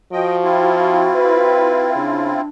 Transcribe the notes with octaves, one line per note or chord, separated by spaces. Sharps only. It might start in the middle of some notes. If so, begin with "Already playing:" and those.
F3 F#4 D#5 G5
C4 E4 F4
B4
C#3 D4